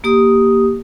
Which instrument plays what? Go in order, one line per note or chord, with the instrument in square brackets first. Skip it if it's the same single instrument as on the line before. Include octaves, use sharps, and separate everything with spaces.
[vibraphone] A#3 G4 D#6